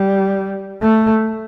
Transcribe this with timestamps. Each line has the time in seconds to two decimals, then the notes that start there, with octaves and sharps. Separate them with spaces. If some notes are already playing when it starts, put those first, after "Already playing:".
Already playing: G3
0.82 A3